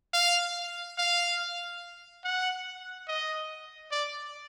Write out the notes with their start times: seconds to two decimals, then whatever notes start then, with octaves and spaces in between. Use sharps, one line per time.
0.13 F5
0.98 F5
2.24 F#5
3.08 D#5
3.91 D5